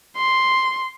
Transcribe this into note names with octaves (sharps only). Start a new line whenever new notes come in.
C6